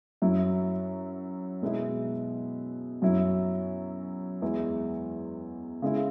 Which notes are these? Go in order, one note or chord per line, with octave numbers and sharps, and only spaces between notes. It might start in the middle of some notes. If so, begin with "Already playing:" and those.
F#2 F#3 E4
B2 G#3 B3 E4
F#2 F#3 E4
E2 E3 G#3 E4
C#3 G#3 E4